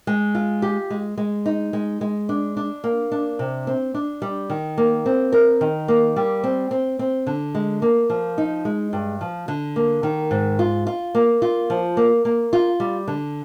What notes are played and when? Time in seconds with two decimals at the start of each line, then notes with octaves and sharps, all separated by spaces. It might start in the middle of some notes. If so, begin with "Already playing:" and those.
0.07 G#3
0.35 F4
0.62 G4
0.90 G#3
1.18 G#3
1.46 D#4
1.73 G#3
2.01 G#3
2.29 D4
2.57 D4
2.84 A#3
3.12 D4
3.39 C3
3.67 C4
3.94 D4
4.22 G3
4.50 D#3
4.78 A#3
5.06 C4
5.32 A#4
5.61 D#3
5.88 A#3
6.16 G3
6.44 C4
6.71 C4
6.99 C4
7.27 D3
7.55 G#3
7.82 A#3
8.10 F3
8.38 D#4
8.65 G#3
8.93 G2
9.21 F3
9.48 D3
9.76 A#3
10.03 D#3
10.31 G#2
10.59 F4
10.87 F4
11.15 A#3
11.42 F4
11.70 F3
11.97 A#3
12.25 A#3
12.53 F4
12.80 G3
13.07 D3